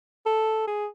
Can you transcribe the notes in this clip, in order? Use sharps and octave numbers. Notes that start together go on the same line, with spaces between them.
A4
G#4